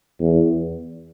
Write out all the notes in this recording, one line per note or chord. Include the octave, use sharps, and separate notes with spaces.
E2